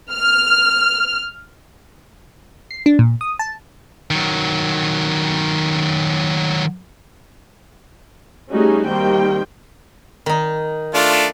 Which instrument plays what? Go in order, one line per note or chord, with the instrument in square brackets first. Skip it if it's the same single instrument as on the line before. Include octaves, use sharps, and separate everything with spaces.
[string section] F6
[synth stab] C7
D4
A#2
D#6
A5
[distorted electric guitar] D#3 F#3
[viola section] G3 A3 C#4 D#4 F#4 G#4
D#3 G3 A#3 C4 G5
[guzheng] D#3 D#4
[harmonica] A3 D4 F4